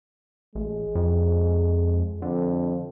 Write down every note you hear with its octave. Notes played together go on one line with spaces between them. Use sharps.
A1 G#3
F2
F2 D3